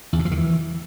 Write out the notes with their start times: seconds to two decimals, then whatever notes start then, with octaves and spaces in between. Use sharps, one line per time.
0.13 E2
0.19 C3
0.25 F3
0.31 D#3
0.38 E3